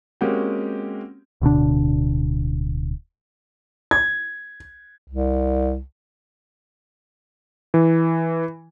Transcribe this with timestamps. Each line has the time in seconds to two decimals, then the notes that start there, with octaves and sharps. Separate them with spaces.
0.21 G#3 A#3 C4 C#4 F#4 G4
1.42 D1 B2 D3 D4
3.91 G#6
5.08 C2
7.74 E3